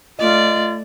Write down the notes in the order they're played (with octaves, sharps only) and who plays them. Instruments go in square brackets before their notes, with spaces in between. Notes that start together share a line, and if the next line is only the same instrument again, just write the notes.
[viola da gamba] A3 D5 [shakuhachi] F4 [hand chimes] D#5